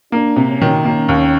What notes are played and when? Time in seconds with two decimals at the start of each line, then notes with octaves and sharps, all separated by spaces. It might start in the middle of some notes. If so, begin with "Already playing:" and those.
0.12 A#3 D4
0.36 C3
0.49 C#4
0.61 D#3
0.85 A#3 C#4
1.09 D#2